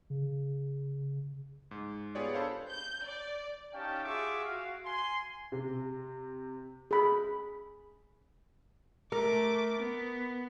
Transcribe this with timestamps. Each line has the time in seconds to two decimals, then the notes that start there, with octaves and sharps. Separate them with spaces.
0.10 C#3
1.71 G#2
2.15 B3 F4 G4 G#4 C#5 D5
2.34 D4 A4 C5 C#5 F5 B5
2.70 G6
3.06 D5
3.74 C#4 D#4 G4 F5 G5 A5
4.04 F4 F#4 G#4 E5 C#6 D6
4.45 F#4 F5
4.86 G#5 C6
5.52 C3
6.91 G#4 B5
9.12 A3 A#4 D6
9.79 B3